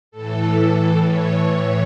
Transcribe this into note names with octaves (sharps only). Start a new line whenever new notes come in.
A2 E3 A4
A2 E3 C#5